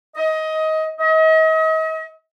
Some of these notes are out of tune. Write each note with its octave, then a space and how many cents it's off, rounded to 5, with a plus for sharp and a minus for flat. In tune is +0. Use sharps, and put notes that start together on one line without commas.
D#5 +20
D#5 +40